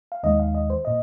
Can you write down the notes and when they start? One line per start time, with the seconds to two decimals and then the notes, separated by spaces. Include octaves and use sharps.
0.12 F5
0.23 D#2 D#3 G#3 D#5
0.40 F5
0.55 D#5
0.70 C5
0.85 A#2 D#5